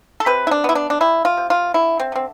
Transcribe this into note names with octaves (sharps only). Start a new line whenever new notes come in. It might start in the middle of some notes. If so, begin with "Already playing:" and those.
A4
C3 B4
E4
D4
B3 E4
D4
D4
G3 E4
F4
C3
F4
D3 E4
C4
D3 C4